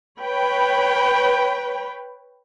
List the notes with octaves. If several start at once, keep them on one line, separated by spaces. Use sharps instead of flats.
B4 C#5 G5 B5